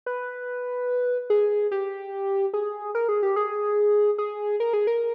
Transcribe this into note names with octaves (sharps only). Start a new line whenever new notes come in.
B4
G#4
G4
G#4
A#4
G#4
G4
G#4
G#4
A#4
G#4
A#4